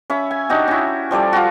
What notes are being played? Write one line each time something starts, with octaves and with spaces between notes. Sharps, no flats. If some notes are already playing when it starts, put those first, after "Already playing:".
C#4 E5 B5
G#5
D4 D#4 F#4 G4
C#4 E4
F3 G3 A4 D5
F4 F#4